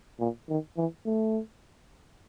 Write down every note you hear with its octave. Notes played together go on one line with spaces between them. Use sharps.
A#2
D#3
E3
A3